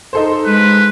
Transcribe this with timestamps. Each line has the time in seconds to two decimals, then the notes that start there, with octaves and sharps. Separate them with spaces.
0.13 D#4 A4 C5
0.46 G#3 B4